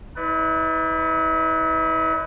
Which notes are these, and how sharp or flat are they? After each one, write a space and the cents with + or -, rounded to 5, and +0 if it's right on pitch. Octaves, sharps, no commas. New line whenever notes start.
E4 -45 B4 +15 D5 +0